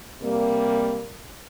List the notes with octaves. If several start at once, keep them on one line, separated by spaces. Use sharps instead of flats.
C3 G3 A#3